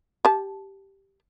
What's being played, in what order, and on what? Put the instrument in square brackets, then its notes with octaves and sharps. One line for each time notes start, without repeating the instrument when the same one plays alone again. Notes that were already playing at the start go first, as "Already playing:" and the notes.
[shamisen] G4 A5